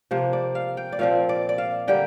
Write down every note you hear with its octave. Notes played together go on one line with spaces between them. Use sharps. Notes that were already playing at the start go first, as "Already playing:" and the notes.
C3 F3 A#3 C5
D5
F5
G5
D5
A#2 F3 C4 F5
D5
D5
F5
D3 G3 A#3 G5